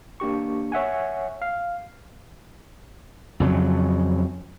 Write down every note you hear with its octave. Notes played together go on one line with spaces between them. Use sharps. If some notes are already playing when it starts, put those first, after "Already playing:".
A#3 D4 G4 C#6
C#5 E5 F#5 G#5
F5
F2 C#3 F#3